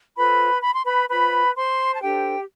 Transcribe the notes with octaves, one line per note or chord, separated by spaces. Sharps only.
F4 A4 B4 C5 B5
B5
C6
B4 B5
F4 B4 C5 B5
C5 C6
A5
D4 G4 A4 C5 G5